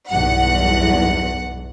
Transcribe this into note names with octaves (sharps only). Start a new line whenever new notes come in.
B1 E2 G2 F#5